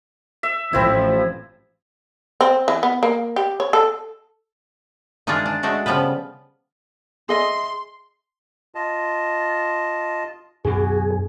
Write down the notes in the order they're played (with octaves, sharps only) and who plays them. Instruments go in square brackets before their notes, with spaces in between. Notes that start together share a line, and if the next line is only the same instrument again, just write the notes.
[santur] E5
[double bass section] A1 F3 [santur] C4 E4
[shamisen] C4
E3
B3
A#3
G4
C#5
A4
[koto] D#3 E3 G#3 D4 F4 G#4
D4
G#3 A3 D4 F#4
C#3 F3 G3 B3 B4
[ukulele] G#4 D#5 E5 [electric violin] C6
[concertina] F4 D#5 A5
[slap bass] F#2 B2 D4 [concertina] F#4 [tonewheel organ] G#4